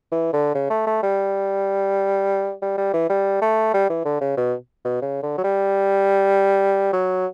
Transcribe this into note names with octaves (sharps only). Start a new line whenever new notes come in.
E3
D3
C#3
A3
A3
G3
G3
G3
E3
G3
A3
G3
E3
D3
C#3
B2
B2
C#3
D3
F#3
G3
F#3